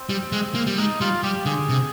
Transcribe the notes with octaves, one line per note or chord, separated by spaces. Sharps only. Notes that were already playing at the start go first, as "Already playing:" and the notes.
Already playing: C4
G3
G#3
A#3
G3
G#3 D#4
G3 F4
G3 G4
D3 G#4
C3